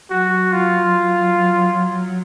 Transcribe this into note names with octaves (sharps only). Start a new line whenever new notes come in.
F#3 F#4
F4